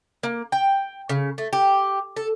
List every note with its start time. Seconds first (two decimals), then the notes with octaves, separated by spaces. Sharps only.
0.23 A#3
0.52 G5
1.09 C#3
1.38 A3
1.53 G4
2.16 A4